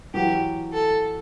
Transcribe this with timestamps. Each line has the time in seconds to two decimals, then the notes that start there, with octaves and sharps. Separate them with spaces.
0.14 E3 F#3 G4
0.73 A4